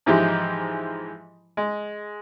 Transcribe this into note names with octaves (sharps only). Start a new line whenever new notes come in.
G#2 E3 F3 G#3 E4 G4
G#3